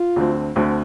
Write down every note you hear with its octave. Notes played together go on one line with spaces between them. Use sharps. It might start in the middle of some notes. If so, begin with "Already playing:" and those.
Already playing: F4
D2 D3 A3 C4
D2 D3 A3 C4